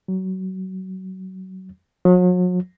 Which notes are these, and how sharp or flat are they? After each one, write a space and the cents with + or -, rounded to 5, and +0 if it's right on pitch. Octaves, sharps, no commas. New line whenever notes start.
F#3 +25
F#3 -40